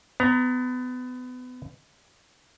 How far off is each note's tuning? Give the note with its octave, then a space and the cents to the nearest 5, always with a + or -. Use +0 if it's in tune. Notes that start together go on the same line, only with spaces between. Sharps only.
B3 +30 A#5 +0